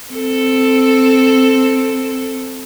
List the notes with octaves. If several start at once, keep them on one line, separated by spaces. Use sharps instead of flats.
C4 A4